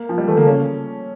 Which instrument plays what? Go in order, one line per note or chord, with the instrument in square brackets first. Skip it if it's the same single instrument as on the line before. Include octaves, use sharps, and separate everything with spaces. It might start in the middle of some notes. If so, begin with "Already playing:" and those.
Already playing: [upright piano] A#3
F3
G3
[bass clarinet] E3 [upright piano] A3
[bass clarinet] D3 [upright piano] A#3
[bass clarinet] C#3 [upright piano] C#4